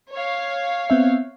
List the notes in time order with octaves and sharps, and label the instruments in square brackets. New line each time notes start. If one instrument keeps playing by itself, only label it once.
[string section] C#5 F5
[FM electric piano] B3 C4 E5